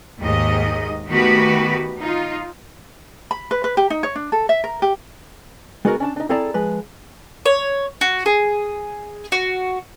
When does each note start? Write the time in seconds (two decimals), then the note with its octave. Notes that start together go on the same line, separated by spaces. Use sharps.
0.21 D#2 G#2 D#3 D#5
1.08 D#3 A3 B3 F#4 G4 B4
2.01 D#4 F4
3.31 B5
3.51 B4
3.64 B4
3.77 G4
3.90 D#4
4.03 C#5
4.16 D4
4.32 A4
4.49 E5
4.64 A#4
4.82 G4
5.85 G#3 B3 D#4 F#4 A4 A#4
6.00 C#4 D4 A5
6.16 D4 D#4
6.29 C4 E4 G#4 A4 D5 A#5
6.54 F3 G#3 B4
7.46 C#5
8.01 F#4
8.26 G#4
9.32 F#4